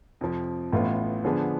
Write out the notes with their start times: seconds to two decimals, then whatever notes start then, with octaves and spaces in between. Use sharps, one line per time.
0.21 F2 C3 F3
0.73 A1 A2 E3 B3 F4
1.24 D3 F3 B3 D4 G#4